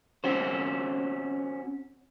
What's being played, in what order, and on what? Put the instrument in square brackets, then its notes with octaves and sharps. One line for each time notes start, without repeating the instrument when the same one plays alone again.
[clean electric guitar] C4 C#4 F#4 C5